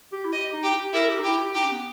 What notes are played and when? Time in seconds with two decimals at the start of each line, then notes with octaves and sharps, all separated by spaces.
0.12 G4
0.25 E4
0.32 G4 D#5
0.53 D#4
0.63 G4
0.74 G4
0.93 E4 A#4
1.09 G4
1.19 D#4
1.24 E4 G4
1.40 G4
1.55 D#4 G4
1.64 C#4
1.71 B3